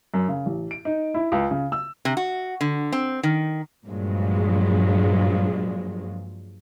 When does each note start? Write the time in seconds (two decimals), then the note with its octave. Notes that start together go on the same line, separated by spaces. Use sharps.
0.14 F#2
0.28 C#3
0.46 A1
0.71 D7
0.85 D#4
1.14 E4
1.32 C#2
1.51 C#3
1.72 E6
2.05 C3
2.17 F#4
2.61 D3
2.93 C4
3.23 D#3
3.86 G2 A#2 F3 F#3 G#3